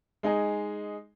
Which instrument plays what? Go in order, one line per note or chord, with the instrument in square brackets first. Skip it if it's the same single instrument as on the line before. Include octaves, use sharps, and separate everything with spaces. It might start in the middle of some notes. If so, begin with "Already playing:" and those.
[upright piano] G#3 D#4 G#4